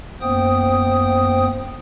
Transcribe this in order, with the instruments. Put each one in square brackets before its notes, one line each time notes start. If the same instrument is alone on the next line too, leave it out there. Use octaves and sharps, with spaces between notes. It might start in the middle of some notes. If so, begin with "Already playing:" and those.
[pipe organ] F#2 A#3 B3 C5 G5 D#6